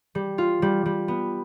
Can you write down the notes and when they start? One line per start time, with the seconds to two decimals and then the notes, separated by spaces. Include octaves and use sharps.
0.15 G3
0.38 F4
0.62 G3
0.86 G3
1.08 B3